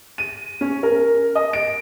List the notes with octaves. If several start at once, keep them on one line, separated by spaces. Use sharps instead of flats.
D#7
C#4
A#4
D#5
D7